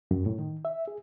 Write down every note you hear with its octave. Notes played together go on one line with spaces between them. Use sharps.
F#2
A2
D#3
E5
G#4